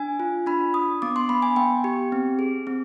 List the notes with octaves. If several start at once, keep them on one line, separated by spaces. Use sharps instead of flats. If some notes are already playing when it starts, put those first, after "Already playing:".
Already playing: D4 G#5
F4
D4 B5
D4 D#6
B3 D6
C6
B3 B5
G#5
B3 G5
G4
C4
G#4
C4